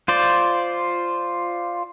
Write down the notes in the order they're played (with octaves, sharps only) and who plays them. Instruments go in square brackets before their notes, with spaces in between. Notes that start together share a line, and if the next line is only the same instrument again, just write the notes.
[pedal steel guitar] F4 C5 D5